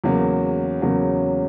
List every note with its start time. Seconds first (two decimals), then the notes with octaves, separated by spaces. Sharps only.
0.04 E2 C#3 F#3 A#3
0.82 E2 C#3 F#3 A#3